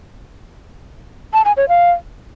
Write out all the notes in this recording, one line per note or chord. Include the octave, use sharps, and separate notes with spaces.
A5
G#5
C#5
F5